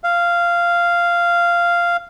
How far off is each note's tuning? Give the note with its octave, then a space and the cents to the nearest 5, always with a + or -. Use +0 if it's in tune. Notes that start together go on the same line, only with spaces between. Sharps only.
F5 -10